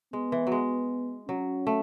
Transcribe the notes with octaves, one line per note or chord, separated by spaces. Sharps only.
G#3 B3
E3
F#3
G#3
F#3 C#4
A3